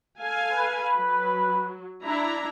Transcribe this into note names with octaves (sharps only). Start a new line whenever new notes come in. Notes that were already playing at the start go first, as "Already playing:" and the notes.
A4 F5 G#5
B4
F#3
D4 E4 A#5